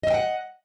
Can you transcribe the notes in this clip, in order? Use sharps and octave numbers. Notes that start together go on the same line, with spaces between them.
D#5 E5 F#5 G5